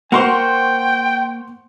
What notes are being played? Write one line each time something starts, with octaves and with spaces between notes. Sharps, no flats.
A#3 A#4 C5 F#5 G5 C6 C#6